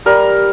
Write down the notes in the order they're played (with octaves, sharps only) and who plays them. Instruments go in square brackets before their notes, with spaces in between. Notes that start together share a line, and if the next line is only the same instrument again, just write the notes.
[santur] G3 A#4